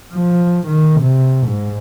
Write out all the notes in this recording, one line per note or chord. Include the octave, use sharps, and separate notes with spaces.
F3
D#3
C3
G#2